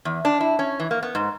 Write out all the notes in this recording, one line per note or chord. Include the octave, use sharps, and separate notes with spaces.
E2
D4
E4
C#4
E3
A#3
B3
G#2